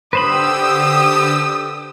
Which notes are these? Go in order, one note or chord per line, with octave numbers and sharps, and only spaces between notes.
D3 G4 B4 C5 B5 D#6 E6